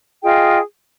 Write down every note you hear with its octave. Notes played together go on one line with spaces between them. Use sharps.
F4 G#4 D#5 G5